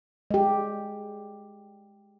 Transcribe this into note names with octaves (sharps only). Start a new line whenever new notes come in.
G#3 G4